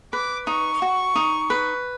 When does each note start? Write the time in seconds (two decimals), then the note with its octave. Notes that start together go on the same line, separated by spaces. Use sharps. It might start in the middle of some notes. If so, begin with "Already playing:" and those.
0.13 B4 D6
0.47 D#4 C#6
0.82 F#4
1.16 D#4
1.50 B4